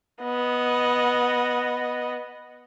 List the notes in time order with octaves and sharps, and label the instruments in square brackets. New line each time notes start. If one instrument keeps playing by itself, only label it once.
[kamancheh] B3 D#5